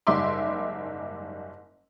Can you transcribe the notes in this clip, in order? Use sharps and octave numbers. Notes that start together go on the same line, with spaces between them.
F#1 G#2 G3 E5 C6 D6